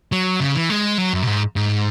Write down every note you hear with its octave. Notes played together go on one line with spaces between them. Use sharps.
F#3
C#3
E3
G#3
F#3
F#2
B2
G#2
G#2